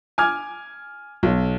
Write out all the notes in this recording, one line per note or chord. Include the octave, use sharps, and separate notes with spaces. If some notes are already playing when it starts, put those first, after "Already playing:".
G#5 D6 F6 G#6
B1